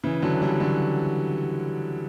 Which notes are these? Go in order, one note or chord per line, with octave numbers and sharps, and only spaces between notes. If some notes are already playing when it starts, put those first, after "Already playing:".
C#3 E3
D3 F#3
E3 G3
D3 F#3